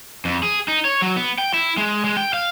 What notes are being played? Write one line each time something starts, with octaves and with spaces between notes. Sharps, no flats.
F2
G#4
D#4
C#5
F#3
B3
G5
E4
G#3
G#3
G5
F5